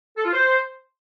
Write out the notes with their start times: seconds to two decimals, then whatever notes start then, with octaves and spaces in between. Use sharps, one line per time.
0.17 A4
0.25 F4
0.32 C5